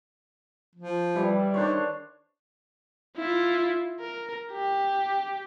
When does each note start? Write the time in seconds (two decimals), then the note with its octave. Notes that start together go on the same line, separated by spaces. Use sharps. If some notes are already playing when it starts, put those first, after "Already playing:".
0.75 F3
1.16 E3 G3
1.54 D#3 D4 C5 C#5
3.17 E4 F4
4.01 A#4
4.52 G4